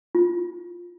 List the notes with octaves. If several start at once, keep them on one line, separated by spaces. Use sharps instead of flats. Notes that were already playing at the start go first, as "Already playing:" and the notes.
F4